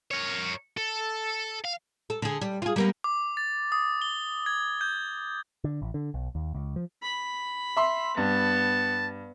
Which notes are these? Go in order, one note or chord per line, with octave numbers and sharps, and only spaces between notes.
A#4 C#5
A4
F5
A4
D3 G#4
G3
F4 G#4
G3 A#3 B3
D6
A6
D#6
G7
G#6
G6
D3
A1
D3
B1
D#2
C#2
F3
B5
E5 C6
G2 B3 A5